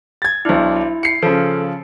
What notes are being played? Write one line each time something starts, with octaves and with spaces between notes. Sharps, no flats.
G#6 A6
B1 D4 E4 C5
E4
C7 C#7
C#3 F3 A4